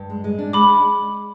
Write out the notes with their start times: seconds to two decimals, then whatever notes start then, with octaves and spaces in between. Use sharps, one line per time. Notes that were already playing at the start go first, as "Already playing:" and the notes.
Already playing: G2
0.10 G#3
0.24 G#3
0.39 D4
0.53 G#3 B5 D6